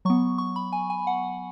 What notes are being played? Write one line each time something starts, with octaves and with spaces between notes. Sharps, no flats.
F#3 B3 C#6
C#6
B5
G#5
G#5
F#5